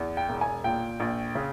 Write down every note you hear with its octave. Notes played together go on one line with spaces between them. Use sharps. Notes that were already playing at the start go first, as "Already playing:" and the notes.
Already playing: E2
G5
E1
G#5
A#2 G5
A#1
C#3